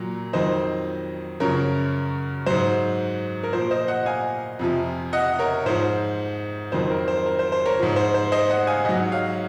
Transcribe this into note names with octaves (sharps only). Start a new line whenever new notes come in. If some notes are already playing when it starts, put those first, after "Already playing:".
Already playing: A#2 F#3
F2 D#3 F#3 C5 D#5
F#2 C#3 F3 A#4 C#5
G#2 F#3 C5
A#4
A#2 F3 C5
C5 D#5
D#5 F#5
F5 G#5
F2 C3 F3
D#5 F#5
A#4 C#5
G#2 F3 C5
F2 D#3 F#3 C5
A#4
C5
A#4
C5
C5
A#4 C#5
G#2 F3
C5
C5
C5 D#5
D#5 F#5
F5 G#5
G#2 F#3 D#5 F#5
C#5 F5